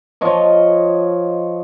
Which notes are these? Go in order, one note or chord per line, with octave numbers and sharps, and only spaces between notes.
F3 C#5 D#5